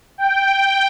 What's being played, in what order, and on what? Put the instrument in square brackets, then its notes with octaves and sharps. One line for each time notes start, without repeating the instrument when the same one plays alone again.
[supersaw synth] G5